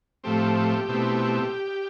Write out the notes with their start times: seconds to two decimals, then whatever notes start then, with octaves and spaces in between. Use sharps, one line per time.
0.24 A2 F3 A3 C4 G4
0.88 B2 A3 C4 E4